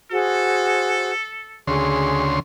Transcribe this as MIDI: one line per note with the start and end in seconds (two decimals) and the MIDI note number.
0.11 1.13 66
0.11 1.13 68
0.11 1.60 69
0.11 1.13 72
1.67 2.40 38
1.67 2.40 49
1.67 2.27 68
1.67 2.40 84